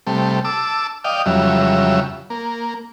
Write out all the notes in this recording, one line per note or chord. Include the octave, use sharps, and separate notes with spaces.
C3 G3 A3
A5 D6 E6
D5 D#5 F5 G5
F2 C#3 F#3 G3 E5
A#3